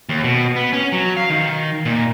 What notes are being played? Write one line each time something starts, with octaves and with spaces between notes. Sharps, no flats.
D#2
B2
B3
C#4
F#3
F5
D#3
A#2